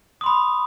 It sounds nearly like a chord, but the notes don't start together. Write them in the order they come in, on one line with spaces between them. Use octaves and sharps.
D#6 C6 B5